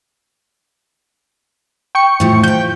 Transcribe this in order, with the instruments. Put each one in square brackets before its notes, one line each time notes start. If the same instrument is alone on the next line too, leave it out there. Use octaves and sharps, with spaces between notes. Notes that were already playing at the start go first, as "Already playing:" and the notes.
[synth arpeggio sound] G5 C#6 C#7
[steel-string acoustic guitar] A2 F3
[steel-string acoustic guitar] F3 G5 [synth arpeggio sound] G6